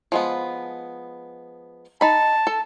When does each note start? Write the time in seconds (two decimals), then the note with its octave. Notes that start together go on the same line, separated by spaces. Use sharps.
0.12 F3 G#3 B3
2.01 D#4 A5 B5
2.47 A4